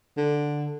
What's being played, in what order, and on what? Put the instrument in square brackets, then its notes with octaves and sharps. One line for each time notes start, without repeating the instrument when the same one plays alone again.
[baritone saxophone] D3